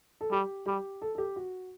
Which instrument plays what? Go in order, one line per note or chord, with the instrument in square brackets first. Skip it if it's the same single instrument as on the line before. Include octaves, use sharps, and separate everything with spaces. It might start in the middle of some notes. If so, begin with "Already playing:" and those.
[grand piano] A4
[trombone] G3 [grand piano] G4
[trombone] G3 [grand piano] G4
[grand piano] A4
A4
G4
F#4